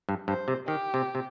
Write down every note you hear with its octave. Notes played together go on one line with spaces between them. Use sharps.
G2
G2 C5
C3
D#3 G4
C3
C3